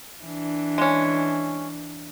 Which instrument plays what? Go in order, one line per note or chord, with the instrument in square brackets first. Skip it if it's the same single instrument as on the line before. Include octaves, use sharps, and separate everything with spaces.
[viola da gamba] E3 D4
[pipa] G#3 C#4